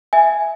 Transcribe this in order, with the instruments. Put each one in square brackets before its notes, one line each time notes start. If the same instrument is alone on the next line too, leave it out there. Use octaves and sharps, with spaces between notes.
[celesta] E5 G#5